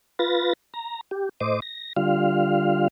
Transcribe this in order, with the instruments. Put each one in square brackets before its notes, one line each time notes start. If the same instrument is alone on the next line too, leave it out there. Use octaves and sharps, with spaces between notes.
[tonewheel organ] F4 B4 A6 A#6
A#5
G4
A2 C5 D#5 D6
A#6
D3 G3 F4 F5